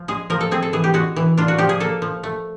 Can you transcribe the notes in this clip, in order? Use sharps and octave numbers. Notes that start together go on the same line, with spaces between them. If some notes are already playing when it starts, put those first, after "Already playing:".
Already playing: F3
G#3 G#4
F3 A#4
A4
C4 G#4
A4
E3 G#4
G4
G#3 F#4
E3
D4 F4
F#4
F3 G4
G#4
A#3 A4
F3
A3